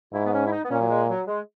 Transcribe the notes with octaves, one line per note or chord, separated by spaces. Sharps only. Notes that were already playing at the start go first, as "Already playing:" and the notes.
G#2 E4
B3
C#4
E4
D#4
B3
A#2 C#4
F#3
G#3
F#3
G#3